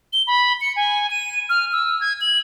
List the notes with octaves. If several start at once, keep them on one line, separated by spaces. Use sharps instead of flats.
G7
B5
C#7
G#5
D#7
F6
E6
G#6
F#7